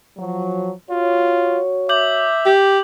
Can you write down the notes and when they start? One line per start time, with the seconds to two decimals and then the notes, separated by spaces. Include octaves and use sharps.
0.18 F3 F#3
0.91 F4 F#4 C#5
1.89 E5 D6 G6 F#7
2.46 G4